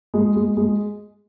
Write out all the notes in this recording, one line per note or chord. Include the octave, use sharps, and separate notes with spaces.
G#3
G#3
G#3